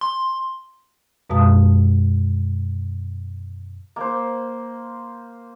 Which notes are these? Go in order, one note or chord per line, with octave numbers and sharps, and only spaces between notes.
C6
F#2 B2 G#3 F5 A5 D#6
A#3 C5